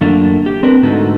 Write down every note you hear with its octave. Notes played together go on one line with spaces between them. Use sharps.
F#2 D3 A3 A#3 D4 F4
G4
C4 D4 A#4 B4
G#2 D3 A3 D#4 F#4 A4